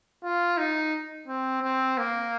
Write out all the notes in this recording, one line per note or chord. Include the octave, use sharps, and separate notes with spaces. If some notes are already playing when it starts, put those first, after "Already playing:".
F4
D#4
C4
C4
A#3